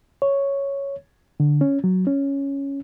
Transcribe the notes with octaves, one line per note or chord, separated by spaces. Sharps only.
C#5
D3
C#4
F#3
C#4